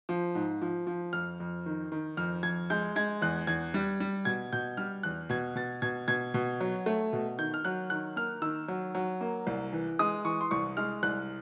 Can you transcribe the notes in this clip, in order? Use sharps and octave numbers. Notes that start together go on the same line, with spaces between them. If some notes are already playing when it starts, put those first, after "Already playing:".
F3
G#2
F3
F3
F2 F6
F2
D#3
D#3
F2 F6
F2 G#6
G#3 G6
G#3 G#6
E2 F#6
E2 G#6
G3
G3
B2 G#6
B2 G6
G3 F6
E2 F#6
B2 G#6
B2 A6
B2 G#6
B2 G#6
B2
F#3
A3
B2
D#3 G6
F6
F#3 F#6
D#3 F#6
A#3 F6
D#3 E6
F#3
F#3
A#3
C2
E3
G#3 D#6
E3 C#6
C6
C2 C#6
G#3 F6
C2 F#6